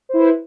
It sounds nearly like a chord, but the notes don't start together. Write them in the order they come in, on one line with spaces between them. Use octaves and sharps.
C5 E4 B4